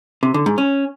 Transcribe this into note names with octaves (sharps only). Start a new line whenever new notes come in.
C3
D3
G#2
C#4